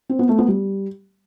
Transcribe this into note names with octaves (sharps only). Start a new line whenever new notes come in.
C4
B3
A3
B3
G3